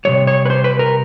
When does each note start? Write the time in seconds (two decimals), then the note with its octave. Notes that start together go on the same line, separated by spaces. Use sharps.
0.05 C3 D#3 G3 C#5
0.27 C#5
0.45 B4
0.50 C5
0.64 B4
0.79 A#4